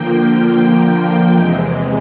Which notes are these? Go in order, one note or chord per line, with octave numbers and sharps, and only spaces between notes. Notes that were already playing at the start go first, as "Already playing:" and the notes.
Already playing: D3 F3 A#3 G5
E2 C3 E3 G#3